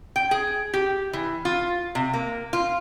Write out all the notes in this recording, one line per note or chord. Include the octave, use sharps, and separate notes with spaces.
G5
G#4
G4
E3
F4
C3
A#3
F4